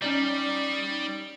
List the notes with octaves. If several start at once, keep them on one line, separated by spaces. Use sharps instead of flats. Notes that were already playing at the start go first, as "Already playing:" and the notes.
G3 C#4 D#4 D5